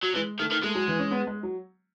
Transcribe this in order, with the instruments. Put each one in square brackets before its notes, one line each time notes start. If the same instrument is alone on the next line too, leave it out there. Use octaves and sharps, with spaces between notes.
[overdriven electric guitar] F#3
[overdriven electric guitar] E3 [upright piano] G#3
[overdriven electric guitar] D#3 [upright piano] A3
[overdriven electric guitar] D#3
[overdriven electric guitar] G#3 [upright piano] A3
[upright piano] F#3
E3
C#4
B3
G#3
F#3